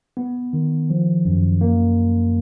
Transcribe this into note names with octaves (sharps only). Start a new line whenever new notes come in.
B3
D#3
F3
F#2
A#3